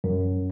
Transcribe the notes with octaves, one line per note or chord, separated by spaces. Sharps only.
F#2